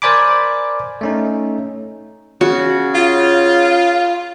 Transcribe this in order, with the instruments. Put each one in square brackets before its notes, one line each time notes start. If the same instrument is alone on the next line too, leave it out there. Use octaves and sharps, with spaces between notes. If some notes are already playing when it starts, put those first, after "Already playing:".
[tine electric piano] A#4 C5 D5 G#5 B5 D6
A3 C#4 D#4
[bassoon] C#3 [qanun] F#4
[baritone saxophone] F4